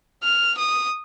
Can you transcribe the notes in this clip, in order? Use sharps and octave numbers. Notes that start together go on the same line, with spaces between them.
F6
D#6